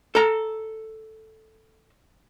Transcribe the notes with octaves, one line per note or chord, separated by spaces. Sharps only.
A4 A#5